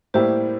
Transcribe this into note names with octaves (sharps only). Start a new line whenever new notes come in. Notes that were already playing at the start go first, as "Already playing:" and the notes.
A2 G3 A#3 E4 G4 C5